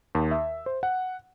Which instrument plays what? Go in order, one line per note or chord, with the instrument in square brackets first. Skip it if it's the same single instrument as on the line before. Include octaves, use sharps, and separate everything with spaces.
[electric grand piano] D#2
E5
C5
F#5